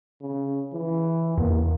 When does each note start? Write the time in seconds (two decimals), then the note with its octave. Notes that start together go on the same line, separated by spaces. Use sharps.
0.21 C#3
0.73 E3
1.38 E2 A#3